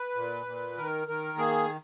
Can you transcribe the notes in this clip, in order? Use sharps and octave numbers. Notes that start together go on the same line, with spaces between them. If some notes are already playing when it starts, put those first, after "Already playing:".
Already playing: B4
A#2
A#2
D#3 A#4
D#3 A#4
A#3 G#4